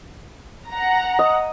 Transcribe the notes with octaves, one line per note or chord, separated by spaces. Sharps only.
F#5 A#5
D#5